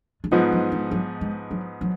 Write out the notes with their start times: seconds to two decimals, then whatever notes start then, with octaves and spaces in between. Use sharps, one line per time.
0.24 G#3
0.31 G#2 F3 F#3 B3 D#4
0.52 F#3
0.72 G#3
0.91 F#3
1.21 G#3
1.51 F#3
1.81 F#3